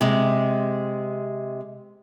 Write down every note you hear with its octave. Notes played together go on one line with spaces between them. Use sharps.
C3 G#3